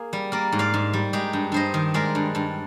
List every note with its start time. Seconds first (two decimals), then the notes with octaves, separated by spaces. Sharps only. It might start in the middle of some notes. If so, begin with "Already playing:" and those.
Already playing: A#3 G#4
0.13 G3
0.32 A#3 A#4 D5
0.52 G#2
0.59 D5 F5
0.74 G#2
0.93 G3
1.13 G#3 D#4 G4
1.33 G2
1.52 G2 C5 D#5
1.74 D#3
1.94 G#3 A#4 D5
2.15 G2
2.35 G2